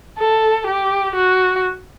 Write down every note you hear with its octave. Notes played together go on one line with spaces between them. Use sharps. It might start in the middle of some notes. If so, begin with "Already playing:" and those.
A4
G4
F#4